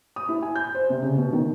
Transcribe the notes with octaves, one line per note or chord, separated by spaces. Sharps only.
D#6
E4
G#5
G6
C5
C3
C#3
B2
D#3